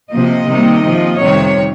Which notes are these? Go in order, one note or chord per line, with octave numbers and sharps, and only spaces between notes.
C3 F3 A#3 D#5
C3 D#3 G3 A#3
C3 F3 A#3
F2 C3 D#3 G3 C#5